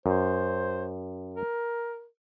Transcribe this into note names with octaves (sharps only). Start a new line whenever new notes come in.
F#2 C5
A#4